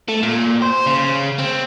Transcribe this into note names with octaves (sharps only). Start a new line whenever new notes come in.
A3
A#2
C5
C#3
C4